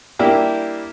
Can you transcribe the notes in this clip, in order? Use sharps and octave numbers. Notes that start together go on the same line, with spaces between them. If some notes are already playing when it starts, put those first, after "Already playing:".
G3 A#3 D4 E4 G4